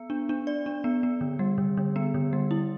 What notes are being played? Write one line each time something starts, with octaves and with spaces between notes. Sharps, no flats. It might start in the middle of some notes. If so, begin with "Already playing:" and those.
Already playing: B3
D4
D4
D5
D4
B3
B3
D3
G3
D3
D3
B3
D3
G3
E4